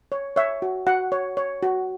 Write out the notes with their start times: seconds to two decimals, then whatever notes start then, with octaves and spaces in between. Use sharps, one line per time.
0.12 C#5
0.36 C#5 E5
0.62 F#4
0.87 F#4 F#5
1.12 C#5
1.37 C#5
1.63 F#4